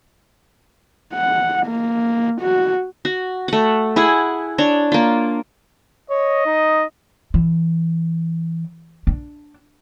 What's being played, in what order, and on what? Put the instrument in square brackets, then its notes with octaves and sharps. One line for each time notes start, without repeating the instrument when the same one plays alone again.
[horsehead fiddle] F#5
A#3
F#4
[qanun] F#4
A3 F#5
E4 G#4 F#5
D4 C#5
A#3 F4
[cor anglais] C#5 [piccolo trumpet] D#5
[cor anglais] D#4
[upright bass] E3
D4